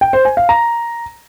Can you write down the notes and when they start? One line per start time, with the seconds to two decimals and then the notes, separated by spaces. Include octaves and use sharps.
0.01 G5
0.13 C5
0.25 G#5
0.37 F5
0.49 A#5